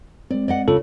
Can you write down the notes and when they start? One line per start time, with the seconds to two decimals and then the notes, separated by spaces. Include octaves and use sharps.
0.31 G#3 C4 D5
0.48 D5 D#5 F#5
0.68 C#3 F4 A4